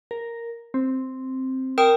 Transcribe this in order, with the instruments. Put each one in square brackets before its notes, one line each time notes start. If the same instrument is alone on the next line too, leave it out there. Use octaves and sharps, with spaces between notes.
[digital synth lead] A#4
C4
[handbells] A#4 G5 D#6